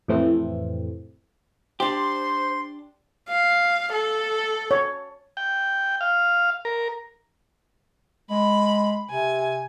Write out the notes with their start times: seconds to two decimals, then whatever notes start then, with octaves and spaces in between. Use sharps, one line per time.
0.08 F2 A2 C3 E3 A3 C4
1.80 D4 G4 C5 C6
3.29 F5
3.93 A4
4.71 C#5
5.37 G5
6.01 F5
6.65 A#4
8.30 G#3 B5
9.10 C3 G#5